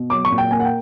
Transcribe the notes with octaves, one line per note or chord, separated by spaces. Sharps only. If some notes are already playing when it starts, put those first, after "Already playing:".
Already playing: B2
F#3 D6
C#6
A#2
G5
A#3 G#5
F#5
G5